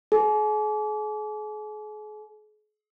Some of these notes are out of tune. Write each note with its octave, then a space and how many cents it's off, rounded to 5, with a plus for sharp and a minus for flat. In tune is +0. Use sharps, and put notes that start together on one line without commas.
G#4 +40